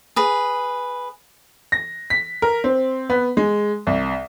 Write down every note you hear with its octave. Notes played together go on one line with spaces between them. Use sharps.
G#4 B4
A#6
B6
A#4
C4
B3
G#3
C2